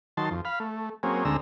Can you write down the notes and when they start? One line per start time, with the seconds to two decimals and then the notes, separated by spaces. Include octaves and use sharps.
0.17 D#3 F#3 A5 C6
0.31 F2
0.45 F5 B5
0.60 A3
1.03 F#3 A#3 C4 C#4 G#4
1.25 D2 D3 G#3 C4 A#5 E6